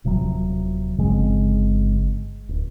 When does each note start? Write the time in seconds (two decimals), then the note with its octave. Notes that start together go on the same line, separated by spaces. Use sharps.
0.04 D#1 C3 F3 F#3
0.97 G1 C#3 G#3 C4
2.49 D1